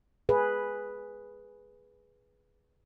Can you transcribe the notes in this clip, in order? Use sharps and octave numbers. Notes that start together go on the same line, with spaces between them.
G#4 B4